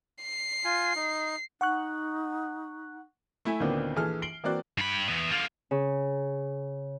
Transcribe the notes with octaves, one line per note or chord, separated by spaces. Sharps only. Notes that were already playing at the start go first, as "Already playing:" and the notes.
C7
F4 G#5
D#4
D#4 F#5 C#6 F#6
A3 E4 E5 G#5
D2 A#2 D#3 B3 C4 D4
A#1 E3 G#4 A4 F6
C7 D7 F#7 G7
E3 A#3 C4 F#4 D5 F#6
G2 B5
E3 B3
D3 F4
C#3